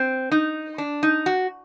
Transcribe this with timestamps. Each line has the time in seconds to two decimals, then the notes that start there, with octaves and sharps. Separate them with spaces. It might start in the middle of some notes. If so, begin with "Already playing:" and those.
Already playing: C4
0.32 D#4
0.78 D4
1.03 D#4
1.26 F#4